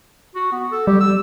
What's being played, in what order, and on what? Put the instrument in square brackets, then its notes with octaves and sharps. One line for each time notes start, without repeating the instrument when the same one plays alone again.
[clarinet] F#4
B3
A4
[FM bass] G3 [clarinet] G4
[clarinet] E6